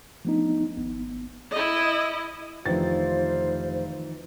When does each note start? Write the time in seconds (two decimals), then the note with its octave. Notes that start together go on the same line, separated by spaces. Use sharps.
0.25 F3 A3 B3 D4 D#4
0.77 G#1 B3
1.51 E4 D#5
2.66 F1 D#3 E3 D4 F4 C5 A6